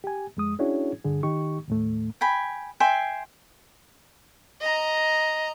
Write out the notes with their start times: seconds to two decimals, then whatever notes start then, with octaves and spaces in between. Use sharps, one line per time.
0.04 G4 G#5
0.37 F2 G#3 D#6
0.59 C#4 D4 E4 F#4 G#4 C#5
1.04 G2 D3 G#4
1.23 D#3 D#4 G4 C#6
1.68 D#2 A2 A3
2.21 G5 G#5 B5
2.80 E5 G5 G#5 C6
4.60 D#5 A#5